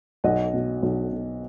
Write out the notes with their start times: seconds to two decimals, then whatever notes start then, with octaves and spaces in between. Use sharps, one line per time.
0.24 B1 D#5 F#5
0.54 B2
0.83 B1
1.12 B2